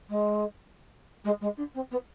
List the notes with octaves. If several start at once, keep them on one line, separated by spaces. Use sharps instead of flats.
G#3
G#3
G#3
D4
C4
B3